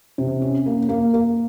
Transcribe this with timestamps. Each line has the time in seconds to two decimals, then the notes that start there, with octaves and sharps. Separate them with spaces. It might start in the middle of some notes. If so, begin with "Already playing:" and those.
0.18 C3
0.42 C#4
0.66 A#3
0.89 A#3
1.14 A#3